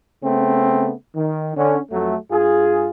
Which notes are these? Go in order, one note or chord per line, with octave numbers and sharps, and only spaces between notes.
C#3 A3 B3 C4
D#3
D3 C#4
F2 F#3 A3
G2 F4 G#4